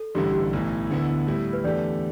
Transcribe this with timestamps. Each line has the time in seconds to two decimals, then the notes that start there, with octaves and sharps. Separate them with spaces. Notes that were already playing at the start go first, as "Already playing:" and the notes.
Already playing: A4
0.15 A1 G2 D3 G3 E4 G4
0.34 G4
0.53 B1 A2 E3
0.90 D2 D3 B3 E4
1.27 A2 G3 E4
1.53 B4
1.64 E2 D3 A3 G4 D5